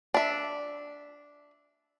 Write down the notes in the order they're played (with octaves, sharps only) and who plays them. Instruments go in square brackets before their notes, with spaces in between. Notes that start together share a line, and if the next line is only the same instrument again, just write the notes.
[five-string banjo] D4 E5